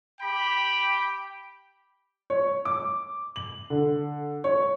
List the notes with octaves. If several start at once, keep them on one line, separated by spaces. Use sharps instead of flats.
G4 G5 B5
C#5
D6
F#7
D3
C#5